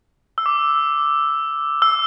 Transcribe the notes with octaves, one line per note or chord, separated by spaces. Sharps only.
E6
D6
E6